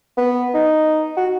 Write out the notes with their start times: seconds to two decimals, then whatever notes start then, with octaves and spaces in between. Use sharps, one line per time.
0.17 B3
0.54 D#4
1.17 F#4